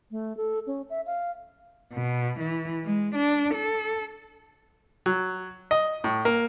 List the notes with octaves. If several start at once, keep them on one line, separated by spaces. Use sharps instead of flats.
A3
A4
C#4
E5
F5
B2
E3
G#3
D4
A4
F#3
D#5
A2
A#3